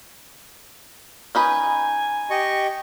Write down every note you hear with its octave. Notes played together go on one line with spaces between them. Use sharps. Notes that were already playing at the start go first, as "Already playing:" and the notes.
C#4 D#4 B4 G#5
G4 D#5 C#6